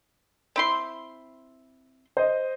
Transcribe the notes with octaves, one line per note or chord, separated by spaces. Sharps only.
C4 E4 C6
C5 D#5